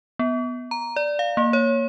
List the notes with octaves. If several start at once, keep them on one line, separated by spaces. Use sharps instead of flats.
B3
A#5
D5
F5
A#3
C#5